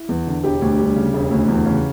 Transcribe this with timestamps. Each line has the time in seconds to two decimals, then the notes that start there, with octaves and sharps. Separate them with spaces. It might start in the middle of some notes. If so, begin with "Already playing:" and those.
Already playing: E4
0.09 E2
0.27 D3
0.44 E1 G4
0.62 D2
0.79 G3
0.96 C#3
1.14 E1
1.31 D2
1.48 E2
1.66 C#3